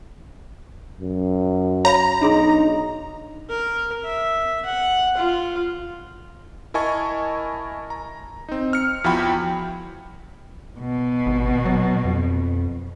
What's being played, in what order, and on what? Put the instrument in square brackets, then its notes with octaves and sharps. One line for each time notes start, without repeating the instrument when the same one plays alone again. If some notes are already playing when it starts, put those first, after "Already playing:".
[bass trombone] F#2
[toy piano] C#5 F5 B5 [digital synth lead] A#5
[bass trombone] B1 [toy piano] D4 G#4 C6 [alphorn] D#4
[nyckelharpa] A#4
E5
F#5
F4
[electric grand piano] E4 A#4 D#5 G#5 A5 C#6
A#5
C4 D#4
F6 C#7
E2 F3 E4 F#4 G5 B5
[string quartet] B2
[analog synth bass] G#1
F#3
F2